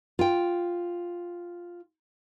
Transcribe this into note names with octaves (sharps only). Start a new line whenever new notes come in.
F4 G5